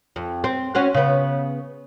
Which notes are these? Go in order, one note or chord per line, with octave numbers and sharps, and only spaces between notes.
F2
C4
C4 C#4 F#4
C#3 B3